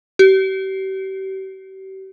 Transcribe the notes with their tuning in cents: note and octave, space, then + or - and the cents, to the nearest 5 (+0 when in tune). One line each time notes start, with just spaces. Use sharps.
G4 -40